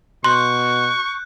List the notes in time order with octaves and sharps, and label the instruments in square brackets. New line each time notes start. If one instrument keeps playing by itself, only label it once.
[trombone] B2 [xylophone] C6 [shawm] C#6 [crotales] F#6 G6